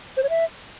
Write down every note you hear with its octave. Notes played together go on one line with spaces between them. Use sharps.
C5
C#5
E5